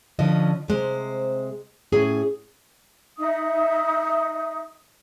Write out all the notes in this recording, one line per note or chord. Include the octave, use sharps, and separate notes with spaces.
D3 F3 C#4 D#5
C3 G#3 C5
A2 C#4 G#4
D#4 E5 D#6